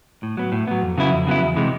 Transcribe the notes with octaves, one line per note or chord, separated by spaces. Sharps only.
A2
F#3 B3
A2
F#3 B3
F2
C#3 F#3 B3 E4
F2
C#3 F#3 B3 E4
E2
C3 E3 G#3